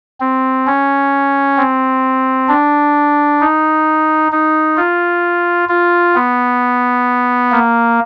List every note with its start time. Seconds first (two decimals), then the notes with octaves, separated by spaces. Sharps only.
0.20 C4
0.67 C#4
1.58 C4
2.49 D4
3.41 D#4
4.32 D#4
4.77 F4
5.69 F4
6.15 B3
7.52 A#3